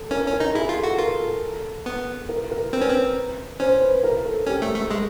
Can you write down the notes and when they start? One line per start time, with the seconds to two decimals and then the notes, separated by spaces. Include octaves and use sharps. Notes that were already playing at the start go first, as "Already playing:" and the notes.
Already playing: A4
0.11 C#4 A#4
0.27 C#4
0.33 A#4
0.40 D#4
0.55 E4 G#4
0.69 F4
0.77 A4
0.83 F#4
0.98 F4 A#4
1.20 A4
1.86 B3
2.29 A#4
2.51 A#4
2.73 C4 B4
2.81 C#4
2.89 C4
3.60 C#4 C5
3.82 B4
4.03 A#4
4.26 A4
4.47 C#4 G4
4.62 A3
4.76 A3
4.91 G#3